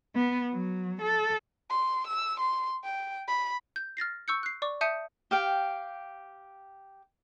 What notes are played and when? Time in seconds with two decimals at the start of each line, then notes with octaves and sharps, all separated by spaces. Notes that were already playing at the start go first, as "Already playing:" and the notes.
0.16 B3
0.52 F#3
1.02 A4
1.70 C6
2.07 E6
2.40 C6
2.84 G5
3.28 B5
3.76 G6
3.97 F6 A6 A#6 C7
4.28 C#6 E6 G6 C#7
4.43 F#6 C7
4.62 D5 C#6 D6
4.81 E5 A5 D#6 G6 C#7 D#7
5.31 G4 F5 G5